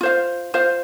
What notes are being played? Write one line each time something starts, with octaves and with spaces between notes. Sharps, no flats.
F4 C5 F5
F4 C5 F5